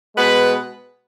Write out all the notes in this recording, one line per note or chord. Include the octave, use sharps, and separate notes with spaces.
B2 G#3 B3 B4